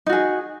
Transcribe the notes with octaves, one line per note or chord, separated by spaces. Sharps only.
D#4 F#4 G#4